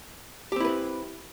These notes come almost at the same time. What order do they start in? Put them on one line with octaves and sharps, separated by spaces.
G4 C4 E4 B4